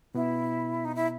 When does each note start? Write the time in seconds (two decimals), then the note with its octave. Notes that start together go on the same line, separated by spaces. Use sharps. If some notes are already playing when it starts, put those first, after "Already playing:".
0.15 B2 B3 E4
0.85 D#4
0.95 E4